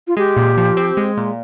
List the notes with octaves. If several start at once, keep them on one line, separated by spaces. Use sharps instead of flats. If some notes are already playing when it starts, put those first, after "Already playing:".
F4
G#3 G4
A#2
F3
C4
G#3
A#2